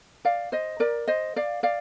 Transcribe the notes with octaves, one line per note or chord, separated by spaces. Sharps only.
D5 F5
C5 D#5
A#4 D5
C5 D#5
D5 F5
D5 F5